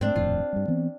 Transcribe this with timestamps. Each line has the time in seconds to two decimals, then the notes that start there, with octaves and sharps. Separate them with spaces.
0.01 G#2 A3 C4 D4
0.16 D#1 F2 A2 F4
0.53 G2 G3
0.68 E3 B3 C4